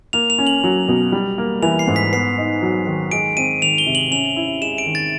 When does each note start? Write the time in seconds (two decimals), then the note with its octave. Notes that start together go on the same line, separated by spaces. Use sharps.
0.13 A#3 F7
0.30 F7
0.39 C#4
0.47 F#7
0.64 F#3
0.88 B2
1.12 G3
1.38 A#3
1.62 E3 F7
1.79 C7
1.88 G#2
1.96 B6
2.12 B3 C7
2.38 D#4
2.62 F#3
2.87 D#3
3.11 G#3 D7
3.37 C4 D#7
3.62 D#3 F7
3.78 G7
3.86 C3
3.95 F#7
4.11 C#4 F7
4.36 E4
4.62 G#3 E7
4.78 D7
4.86 D#3
4.95 A6